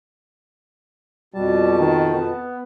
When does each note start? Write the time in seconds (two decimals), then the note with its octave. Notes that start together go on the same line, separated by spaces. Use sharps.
1.34 F2 B2 G3 A5
1.80 D#3
2.16 B3